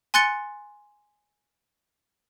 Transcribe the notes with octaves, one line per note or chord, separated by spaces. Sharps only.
G#5 C6 F#6 A6 C#7 G7